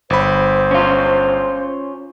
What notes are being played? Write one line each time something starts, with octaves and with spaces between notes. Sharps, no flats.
G1 C5 B5
C#4 F4